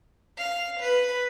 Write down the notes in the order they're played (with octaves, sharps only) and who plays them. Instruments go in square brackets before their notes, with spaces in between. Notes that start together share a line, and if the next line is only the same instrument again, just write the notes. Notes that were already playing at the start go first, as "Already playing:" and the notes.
[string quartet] F5
B4